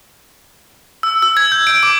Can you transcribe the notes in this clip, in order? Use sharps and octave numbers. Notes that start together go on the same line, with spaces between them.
E6
E6
G#6
G6
D7
D6